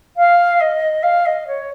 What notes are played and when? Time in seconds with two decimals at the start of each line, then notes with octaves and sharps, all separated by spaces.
0.16 F5
0.59 D#5
1.02 F5
1.25 D#5
1.47 C#5